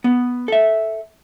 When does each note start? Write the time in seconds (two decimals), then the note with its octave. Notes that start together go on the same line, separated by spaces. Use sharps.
0.04 B3
0.48 A4 E5